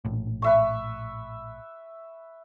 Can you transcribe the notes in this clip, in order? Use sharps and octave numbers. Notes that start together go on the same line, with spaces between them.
A#1 A2
B4 E5 C#6